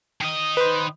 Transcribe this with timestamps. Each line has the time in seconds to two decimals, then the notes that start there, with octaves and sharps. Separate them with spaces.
0.21 D#3 D#5
0.57 B4 C5